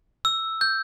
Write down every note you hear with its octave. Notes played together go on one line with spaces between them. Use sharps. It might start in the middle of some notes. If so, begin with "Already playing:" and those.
E6
G6